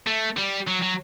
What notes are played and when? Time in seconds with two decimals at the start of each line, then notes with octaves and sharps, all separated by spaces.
0.07 A3
0.37 G3
0.67 F#3
0.82 F#3